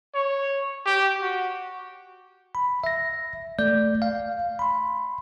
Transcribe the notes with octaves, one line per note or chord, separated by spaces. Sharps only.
C#5
G4
F#4
B5
E5 A#6
A3 D5 G6
F5
B5 C6